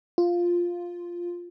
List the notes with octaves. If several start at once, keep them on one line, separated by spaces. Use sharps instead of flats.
F4